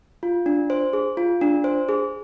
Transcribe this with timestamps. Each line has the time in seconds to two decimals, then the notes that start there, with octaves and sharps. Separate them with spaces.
0.23 F4
0.46 D4
0.70 C5
0.93 G#4
1.17 F4
1.41 D4
1.64 C5
1.89 G#4